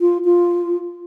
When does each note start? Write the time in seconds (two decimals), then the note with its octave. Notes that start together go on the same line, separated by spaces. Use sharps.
0.01 F4
0.25 F4